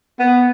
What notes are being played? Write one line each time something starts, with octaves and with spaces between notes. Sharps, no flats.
B3